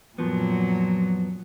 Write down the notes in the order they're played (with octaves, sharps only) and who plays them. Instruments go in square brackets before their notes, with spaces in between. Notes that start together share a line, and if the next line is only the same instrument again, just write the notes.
[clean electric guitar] F#2 F3 B3 [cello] A#2 F#3